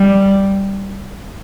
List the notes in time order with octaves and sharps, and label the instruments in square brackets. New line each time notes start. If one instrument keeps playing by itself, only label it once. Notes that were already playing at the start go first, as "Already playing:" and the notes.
Already playing: [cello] G3